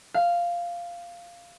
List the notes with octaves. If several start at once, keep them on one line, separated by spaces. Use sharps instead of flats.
F5